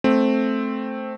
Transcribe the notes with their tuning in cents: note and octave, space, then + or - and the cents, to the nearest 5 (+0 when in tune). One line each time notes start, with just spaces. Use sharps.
A3 -5 C4 +0